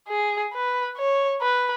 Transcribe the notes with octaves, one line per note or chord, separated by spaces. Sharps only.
G#4
B4
C#5
B4